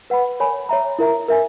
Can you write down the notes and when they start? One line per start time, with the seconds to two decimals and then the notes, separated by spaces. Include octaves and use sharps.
0.10 B4 F#5 B5
0.40 A#4 C#5 G#5 B5
0.69 C#5 E5 A#5
0.99 E4 A#4 E5 A#5
1.28 A#4 E5 G#5